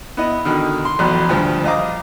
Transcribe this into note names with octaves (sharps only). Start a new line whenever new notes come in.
B3 E4 D#5
B2 D3 D#3
C6
A1 F2 F#3 B3
D2 G2 F3 G5
A#1 D#5 F5 A#5 D6 D#6